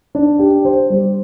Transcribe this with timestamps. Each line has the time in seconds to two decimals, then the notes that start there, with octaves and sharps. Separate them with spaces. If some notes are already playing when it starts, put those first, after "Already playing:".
0.15 D4
0.39 G4
0.65 C5
0.90 G3